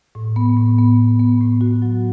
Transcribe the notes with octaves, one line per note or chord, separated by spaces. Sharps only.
A2
B3
A2
B3
A2
B3
A2
F#4
F#3